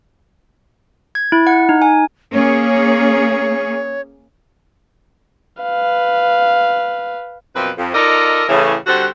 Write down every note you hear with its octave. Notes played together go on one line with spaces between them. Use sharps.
G#6
E4
F#5
D#4
G#5
A#3 C#4 G#4 C#5
B4 F5
F#2 B2 F3 C4 B4
F2
D#4 F4 A4 A#4 D5 D#5
A2 C#3 E3
D3 G3 C4 F#4 C5 F#5